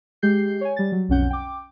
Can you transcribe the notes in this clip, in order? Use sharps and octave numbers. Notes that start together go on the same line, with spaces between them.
G#3 G4 G6 C7
C#5 G#5
G3 A6
F#3
B1 F2 C#4 F#5 G6
G5 D6